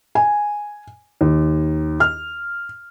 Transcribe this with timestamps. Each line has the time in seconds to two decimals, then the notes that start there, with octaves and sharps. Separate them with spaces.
0.15 G#5
1.21 D#2
2.00 F6